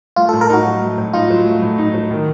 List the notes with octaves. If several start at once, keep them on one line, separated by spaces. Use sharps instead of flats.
A3 F4
A4
A2
A#4
D#4 F#4
F#3
A3
A2
D#4 F4
F#3
A3
A2
D#4
F#3
D#3